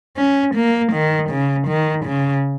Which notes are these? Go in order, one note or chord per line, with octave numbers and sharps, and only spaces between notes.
C#4
A#3
D#3
C#3
D#3
C#3